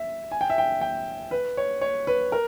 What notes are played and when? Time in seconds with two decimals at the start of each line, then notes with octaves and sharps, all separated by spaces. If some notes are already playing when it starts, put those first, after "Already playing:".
Already playing: E5
0.31 G#5
0.41 G5
0.50 E5
0.58 G5
0.81 G5
1.31 B4
1.57 C#5
1.81 C#5
2.07 B4
2.32 A#4